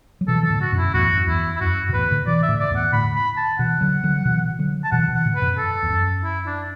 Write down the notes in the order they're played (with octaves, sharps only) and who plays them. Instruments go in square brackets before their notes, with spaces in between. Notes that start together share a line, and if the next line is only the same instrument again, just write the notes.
[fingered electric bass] F#3
[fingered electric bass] B2 E3 [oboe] A4
[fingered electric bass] E3 [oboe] A4
[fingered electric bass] A2 D3
[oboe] F#4
[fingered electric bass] F#2 B2
[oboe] E4
[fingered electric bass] E2 A2 [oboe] F#4
[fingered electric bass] F#2
[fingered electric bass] E2 [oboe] E4
[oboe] E4
[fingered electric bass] F#2 [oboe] F#4
[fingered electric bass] B2
[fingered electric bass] E2 A2 [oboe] B4
[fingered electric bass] A2 D3
[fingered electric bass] B2 E3 [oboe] D5
[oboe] E5
[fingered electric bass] A2 D3
[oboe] D5
[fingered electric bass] E2 A2
[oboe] F#5
[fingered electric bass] A2 D3 [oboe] B5
[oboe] B5
A5
[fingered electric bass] B2 E3 [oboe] F#5
[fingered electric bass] D3 F#3
D3 F#3
B2 E3
D3 F#3
[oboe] A5
[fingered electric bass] B2 E3 [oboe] F#5
[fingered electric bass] B2 E3
[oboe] F#5
[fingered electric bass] A2 D3
[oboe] B4
[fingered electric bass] F#2 B2
[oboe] A4
[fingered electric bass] E2
F#2
[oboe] E4
D4